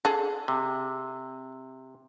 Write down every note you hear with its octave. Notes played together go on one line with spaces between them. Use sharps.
G#4 A4
C3